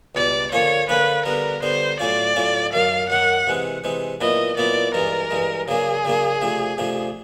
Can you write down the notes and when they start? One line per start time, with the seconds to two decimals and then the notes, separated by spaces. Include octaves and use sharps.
0.15 C#2 B2 G3 D5
0.51 D3 F3 A#3 C#4 F4 C#5
0.89 D3 F3 A#3 C#4 F4 B4
1.25 D3 G3 B3 A#4
1.62 D3 G3 B3 C5
1.99 A2 F#3 A3 C#4 F4 D5
2.36 A2 F#3 A3 C#4 F4
2.73 F#2 D#3 F#3 F5
3.09 F#2 D#3 F#3 F#5
3.47 C3 E3 G#3 C4
3.84 C3 E3 G#3 C4
4.21 A#2 F#3 B3 E4 D#5
4.57 A#2 F#3 B3 E4 D5
4.94 G2 E3 G#3 A#4
5.31 G2 E3 G#3
5.68 C#3 F#3 A#3 D4 G#4
6.05 C#3 F#3 A#3 D4
6.41 C3 F3 A3 D4
6.78 C3 F3 A3 D4